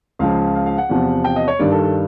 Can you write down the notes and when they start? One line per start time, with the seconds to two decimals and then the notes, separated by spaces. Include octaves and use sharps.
0.19 C#2 C#3 F3 F5
0.55 F5
0.66 F5
0.78 F#5
0.89 E2 C3 F3
1.24 G5
1.36 D#5
1.48 C#5
1.59 G2 D#3 G3 D5
1.71 A4
1.83 A4